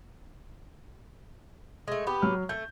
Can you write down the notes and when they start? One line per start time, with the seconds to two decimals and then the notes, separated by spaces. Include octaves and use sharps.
1.88 G#3 A3
2.07 B3 G4
2.22 F#3 F6
2.49 A3 G6